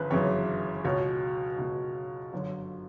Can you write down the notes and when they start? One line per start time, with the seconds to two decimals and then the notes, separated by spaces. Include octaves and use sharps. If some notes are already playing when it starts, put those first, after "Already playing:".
Already playing: G1 C#3 E3 B4
0.11 G1 F#2 C#3 E3 C#5
0.84 C#2 B2 C#5
1.58 C#2 B2
2.33 G1 F#2 D3